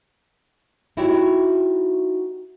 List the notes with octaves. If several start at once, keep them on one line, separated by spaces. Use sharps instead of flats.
D#4 E4 F#4 G4 C#5 E5